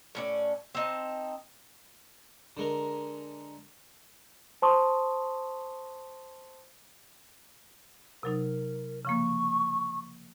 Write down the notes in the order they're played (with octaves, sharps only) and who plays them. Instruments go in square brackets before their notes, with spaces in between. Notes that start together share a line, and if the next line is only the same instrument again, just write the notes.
[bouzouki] A2 C#4 D5
C4 D#4 A5
[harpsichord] D3 G#3 A#4
[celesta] C5 A5 C6 C#6 D#6
[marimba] C3 F#3 D#4 [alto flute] A#4
[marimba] C#3 F3 A#3 [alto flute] C#6